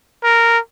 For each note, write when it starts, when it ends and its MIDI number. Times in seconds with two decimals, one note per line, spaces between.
0.24 0.59 70